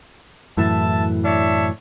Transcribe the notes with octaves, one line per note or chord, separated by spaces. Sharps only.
F#2 A2 E3 E5 A5
D4 C#5 E5